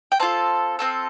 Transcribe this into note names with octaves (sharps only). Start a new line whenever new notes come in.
G5
C4 F4 A4 A5
C4 F4 A4